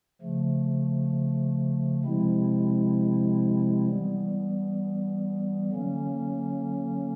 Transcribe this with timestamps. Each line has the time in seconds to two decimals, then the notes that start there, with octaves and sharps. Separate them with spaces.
0.21 C#3 F3 A3
2.04 C3 F3 G#3 C4 E4
3.88 E3 G3 B3
5.71 D3 F#3 A#3 C#4